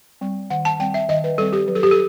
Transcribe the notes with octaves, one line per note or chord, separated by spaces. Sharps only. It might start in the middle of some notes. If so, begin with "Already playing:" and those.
G3 C4
D#3 F#5
A5
G3 C4 G5
E5
D#3 D#5
B4
G3 C4 A4
G4
F#3 B4
A4
G4
A4